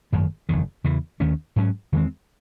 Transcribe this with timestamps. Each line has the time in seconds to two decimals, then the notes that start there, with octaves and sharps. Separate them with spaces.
0.13 G#1 F#2 D#3 A3
0.49 F#1 E2 D#3
0.84 E2 C#3 E3
1.20 D#2 D#3 A3 C#4
1.56 G#2 F#3 C#4
1.92 E2 D#3 G#3 C4